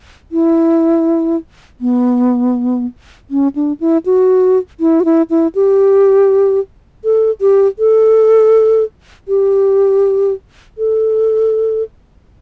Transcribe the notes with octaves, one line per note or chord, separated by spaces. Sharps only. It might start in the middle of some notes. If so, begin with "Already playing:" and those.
E4
B3
C#4
D4
E4
F#4
E4
F#4
E4
E4
G4
A4
G4
A4
G4
A4